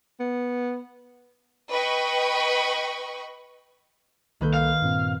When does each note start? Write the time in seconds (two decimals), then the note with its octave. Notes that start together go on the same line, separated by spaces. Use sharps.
0.20 B3
1.72 B4 D#5 G5 B5 C#6
4.41 C2 D#3 A#3 A4 B4 G6
4.54 F5
4.82 G2 A#2 C4